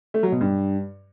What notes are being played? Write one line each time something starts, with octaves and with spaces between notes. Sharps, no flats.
A3
F#3
B2
G2